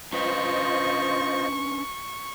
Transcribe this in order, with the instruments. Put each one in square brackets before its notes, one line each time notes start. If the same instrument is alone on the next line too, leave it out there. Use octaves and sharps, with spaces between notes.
[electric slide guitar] C#4 D4 B4 [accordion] F4 C5 D#5 [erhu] C#6